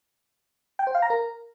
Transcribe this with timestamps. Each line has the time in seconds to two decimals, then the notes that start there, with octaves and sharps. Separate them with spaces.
0.79 G5
0.87 C5
0.95 F5
1.02 A#5
1.10 A#4